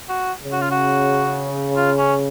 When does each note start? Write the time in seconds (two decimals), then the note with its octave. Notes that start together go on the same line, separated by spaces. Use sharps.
0.09 F#4
0.42 C#3
0.52 F#4
0.61 F4
0.71 F#4
1.76 F4
1.98 C#4